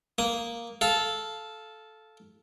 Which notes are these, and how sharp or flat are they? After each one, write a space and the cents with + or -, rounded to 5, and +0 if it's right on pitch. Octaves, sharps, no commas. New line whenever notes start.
A#3 +0 D#6 +0
A4 -10 F5 +0